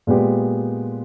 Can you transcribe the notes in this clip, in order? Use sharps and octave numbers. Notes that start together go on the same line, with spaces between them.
A#2 G#3 B3 G4